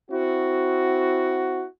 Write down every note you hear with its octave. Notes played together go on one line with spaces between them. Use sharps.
C4 E4 F#4